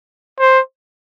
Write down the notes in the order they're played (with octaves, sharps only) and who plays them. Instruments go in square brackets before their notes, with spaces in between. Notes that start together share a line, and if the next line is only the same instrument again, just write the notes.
[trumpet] C5